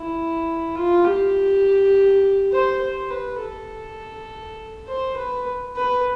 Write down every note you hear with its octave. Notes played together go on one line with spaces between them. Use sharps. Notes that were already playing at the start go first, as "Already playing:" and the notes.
Already playing: E4
F4
G4
C5
C5
B4
A4
C5
B4
B4